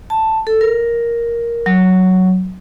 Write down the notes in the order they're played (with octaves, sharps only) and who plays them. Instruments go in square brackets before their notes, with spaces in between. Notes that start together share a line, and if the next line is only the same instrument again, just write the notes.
[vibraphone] A5
A4
A#4
F#3